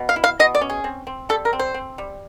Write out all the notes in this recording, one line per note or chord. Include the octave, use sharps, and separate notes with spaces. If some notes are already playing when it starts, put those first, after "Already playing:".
Already playing: B2
F5
E4
F5
B2 D#5
D5
C#4
G#4
C4
C4
G3 A4
A#4
C4
C5
C4
G3